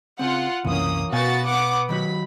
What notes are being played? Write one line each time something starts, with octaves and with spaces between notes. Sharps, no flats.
C#3 C4 F4 F#5
F#1 C2 E3 A#3 C#4 D#6
B2 B3 F#4 F5 G#5 A6
B3 F#5 D6
D#3 F#3 F#4 B5